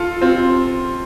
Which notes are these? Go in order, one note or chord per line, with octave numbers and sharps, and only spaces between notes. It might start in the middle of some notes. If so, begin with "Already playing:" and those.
Already playing: F4 A4
C4 F4